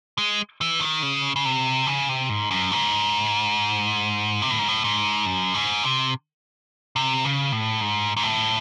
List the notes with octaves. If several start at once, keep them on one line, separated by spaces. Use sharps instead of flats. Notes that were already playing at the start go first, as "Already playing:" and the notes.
G#3
E3
D#3
C#3
C#3
C3
C#3
C3
G#2
F#2
G#2
C3
A2
G#2
A2
G#2
F#2
G#2
C3
C3
C#3
A2
G#2
G#2
A2